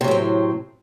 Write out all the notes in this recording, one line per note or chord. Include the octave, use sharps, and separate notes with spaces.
A2 C3 F#3 C4